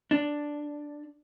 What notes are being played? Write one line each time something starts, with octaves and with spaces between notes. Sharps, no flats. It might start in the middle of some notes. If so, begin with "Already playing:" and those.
D4